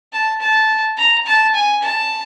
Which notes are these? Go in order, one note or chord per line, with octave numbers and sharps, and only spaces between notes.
A5
A5
A#5
A5
G#5
A5